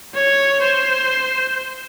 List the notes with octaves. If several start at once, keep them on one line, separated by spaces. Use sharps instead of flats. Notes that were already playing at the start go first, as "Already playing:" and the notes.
C#5
C5